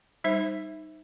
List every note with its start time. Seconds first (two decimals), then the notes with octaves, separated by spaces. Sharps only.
0.24 G3 D#4 C5 E5